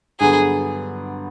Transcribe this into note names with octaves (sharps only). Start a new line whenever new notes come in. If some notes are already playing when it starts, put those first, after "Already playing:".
G2 D3 F#3 B3 G#4